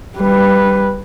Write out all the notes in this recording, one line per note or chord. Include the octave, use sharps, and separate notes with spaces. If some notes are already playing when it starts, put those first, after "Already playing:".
G3 B4